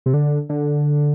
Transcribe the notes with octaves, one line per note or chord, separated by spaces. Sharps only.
C3
D3
D3